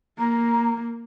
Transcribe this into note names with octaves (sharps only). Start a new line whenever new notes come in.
A#3 A#5